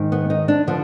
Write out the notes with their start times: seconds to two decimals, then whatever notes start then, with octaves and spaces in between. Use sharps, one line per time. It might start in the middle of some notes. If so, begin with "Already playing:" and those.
Already playing: G#2 D#3
0.12 B3
0.30 D#4
0.48 D4
0.67 D3 F3 B3